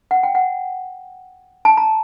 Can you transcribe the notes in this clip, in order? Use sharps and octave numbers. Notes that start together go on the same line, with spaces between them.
F#5
G5
F#5
A5
A#5